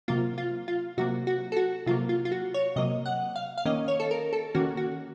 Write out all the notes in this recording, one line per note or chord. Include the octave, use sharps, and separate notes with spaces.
C3 F#3 A#3 F4
F4
F4
C3 F#3 A#3 F#4
F#4
A4
F#4
C3 F#3 A#3 F4
F4
F4
F#4
C#5
C3 F#3 A#3 D#5
F#5
F5
F5
D#3 A#3 C#4 D#5
C#5
A4
A#4
A4
D#3 A#3 C#4 F#4
F#4